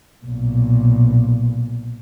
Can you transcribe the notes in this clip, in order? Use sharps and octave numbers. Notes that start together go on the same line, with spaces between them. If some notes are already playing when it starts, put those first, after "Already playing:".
B1 A#2